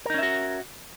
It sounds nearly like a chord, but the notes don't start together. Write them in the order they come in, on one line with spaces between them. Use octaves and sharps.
A#4 D#4 C#4 E5 F#4